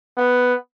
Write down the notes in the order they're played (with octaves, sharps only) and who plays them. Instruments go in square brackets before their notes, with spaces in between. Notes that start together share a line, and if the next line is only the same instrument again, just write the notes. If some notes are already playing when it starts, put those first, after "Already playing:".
[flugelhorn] B3